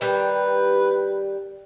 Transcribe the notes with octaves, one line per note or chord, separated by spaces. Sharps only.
D#3 G3 B4